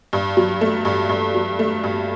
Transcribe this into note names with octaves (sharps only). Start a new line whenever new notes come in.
G2
F#3
A3
G2
G2
F#3
A3
G2